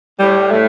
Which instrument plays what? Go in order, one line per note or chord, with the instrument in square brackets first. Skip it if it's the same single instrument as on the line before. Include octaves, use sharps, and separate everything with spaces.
[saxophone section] A2 [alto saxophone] G3
[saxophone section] A2 [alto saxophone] A3